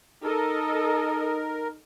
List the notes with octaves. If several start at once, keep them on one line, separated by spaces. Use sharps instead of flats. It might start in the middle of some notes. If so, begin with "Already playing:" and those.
D#4 A4 A#4 D#5